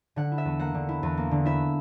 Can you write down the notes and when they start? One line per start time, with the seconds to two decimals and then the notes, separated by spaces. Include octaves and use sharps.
0.16 D3 F#5
0.32 E4
0.38 E5
0.45 E2
0.59 A#3 F#5
0.74 D3
0.89 E4
1.03 E2
1.17 A#3
1.31 D3
1.46 E4 E5